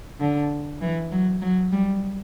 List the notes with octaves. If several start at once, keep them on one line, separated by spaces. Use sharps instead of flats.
D3
E3
F#3
F#3
G3